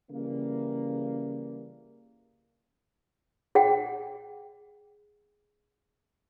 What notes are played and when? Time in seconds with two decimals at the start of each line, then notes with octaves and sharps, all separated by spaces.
0.10 C#3 E3 G3 A#3
3.55 G#4 F#5 G5